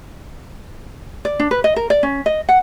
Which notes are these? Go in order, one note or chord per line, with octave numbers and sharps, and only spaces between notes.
D5
D4
B4
D#5
A#4
D5
C#4
D#5
F#5